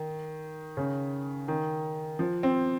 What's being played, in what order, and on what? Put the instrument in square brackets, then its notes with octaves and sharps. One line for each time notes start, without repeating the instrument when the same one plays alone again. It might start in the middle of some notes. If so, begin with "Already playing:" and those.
Already playing: [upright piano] D#3
C#3
D#3
F3
C4